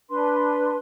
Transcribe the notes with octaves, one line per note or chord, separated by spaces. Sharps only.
D4 B4 C6